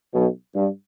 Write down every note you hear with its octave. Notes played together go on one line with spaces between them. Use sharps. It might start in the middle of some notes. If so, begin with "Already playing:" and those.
B1 B2
G2